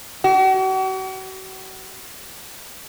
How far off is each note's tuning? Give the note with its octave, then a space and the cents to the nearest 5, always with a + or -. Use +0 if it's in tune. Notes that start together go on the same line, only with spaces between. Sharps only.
F#4 +40